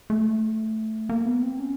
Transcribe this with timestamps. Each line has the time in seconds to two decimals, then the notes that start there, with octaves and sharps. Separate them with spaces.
0.10 A3
1.09 A#3
1.25 B3
1.42 C4
1.59 C#4